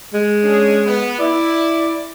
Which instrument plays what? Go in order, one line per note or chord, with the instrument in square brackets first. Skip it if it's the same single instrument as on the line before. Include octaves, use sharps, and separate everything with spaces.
[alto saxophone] G#3
[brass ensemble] C#4 D4 G#4
B3
[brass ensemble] E4 [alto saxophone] D5